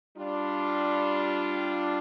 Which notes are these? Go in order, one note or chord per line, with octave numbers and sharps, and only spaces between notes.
G3 D4 F4